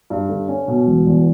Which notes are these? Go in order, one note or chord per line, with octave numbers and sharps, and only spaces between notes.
G2
D3
C#4
B2
E1
E2